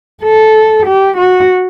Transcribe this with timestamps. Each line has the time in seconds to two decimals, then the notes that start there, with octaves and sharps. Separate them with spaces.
0.23 A4
0.86 G4
1.17 F#4